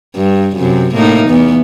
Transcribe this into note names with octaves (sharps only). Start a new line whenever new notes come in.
G2
F#2 C3
A2 A#3 D#4
E2 B3